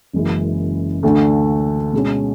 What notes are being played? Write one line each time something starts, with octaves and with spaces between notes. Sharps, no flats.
F#1 F#2 E3 G#3
D2 D3 A3
B2 G#3 C#4